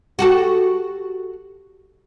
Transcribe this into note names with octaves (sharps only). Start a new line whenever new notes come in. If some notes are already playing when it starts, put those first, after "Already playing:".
F#4 G4 A4